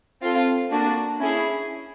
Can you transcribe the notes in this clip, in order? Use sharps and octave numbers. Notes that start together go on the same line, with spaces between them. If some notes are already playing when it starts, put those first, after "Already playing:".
C4 F4 A4
A#3 D4 F#4
C#4 E4 G#4